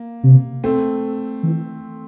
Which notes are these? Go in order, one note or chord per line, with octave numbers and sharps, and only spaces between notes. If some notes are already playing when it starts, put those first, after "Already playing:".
Already playing: A#3
C3
A3 C4
E3